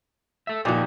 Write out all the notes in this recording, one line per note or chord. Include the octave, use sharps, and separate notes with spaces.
A4 E5
A#2 F3 D#4 F#4 G4